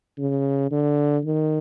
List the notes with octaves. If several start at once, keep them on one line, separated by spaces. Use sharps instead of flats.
C#3
D3
D#3